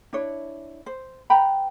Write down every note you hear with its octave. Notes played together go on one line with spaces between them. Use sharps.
D4 E4 C#5
C5
B4 G5 A#5 B5